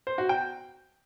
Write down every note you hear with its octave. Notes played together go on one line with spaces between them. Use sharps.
C5
F#4
G5